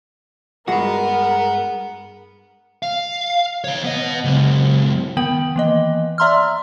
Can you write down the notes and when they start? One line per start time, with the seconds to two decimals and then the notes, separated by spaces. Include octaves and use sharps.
0.68 G2 G#3 F#4 A#4 F#5 B5
2.83 F5
3.64 D#3 C#5
3.84 B3 D#5
4.24 C#2 F#2
5.17 D#3 B3 G5 F#7
5.56 E3 A#3 D#5
6.18 D5 E5 A#5 C6 E6 F6